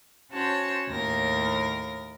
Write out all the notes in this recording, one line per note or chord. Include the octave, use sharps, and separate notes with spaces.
C#4 F#4 C5 C#5 A5
D#2 A2 A#4 A#6